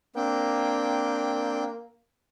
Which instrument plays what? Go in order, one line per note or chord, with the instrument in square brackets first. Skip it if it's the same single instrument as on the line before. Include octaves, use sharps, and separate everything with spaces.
[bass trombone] A#3 [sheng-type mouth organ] C4 D4 G5